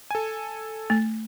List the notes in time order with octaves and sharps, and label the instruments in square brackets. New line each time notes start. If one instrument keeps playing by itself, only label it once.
[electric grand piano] A4 G#5
[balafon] A3